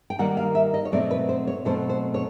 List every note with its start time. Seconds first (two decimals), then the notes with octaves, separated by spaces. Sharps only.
0.10 G5
0.19 D#3 G3 A#3 F#5
0.37 F5
0.55 E5
0.74 D#5
0.85 C#5
0.92 B2 F#3 A3 C4 D5
1.11 B4
1.29 C5
1.47 C#5
1.65 B2 F#3 A3 C4 C5
1.89 C5
2.14 C#5